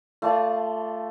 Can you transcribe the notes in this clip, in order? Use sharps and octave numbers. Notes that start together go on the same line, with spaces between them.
A3 F4 D5 A5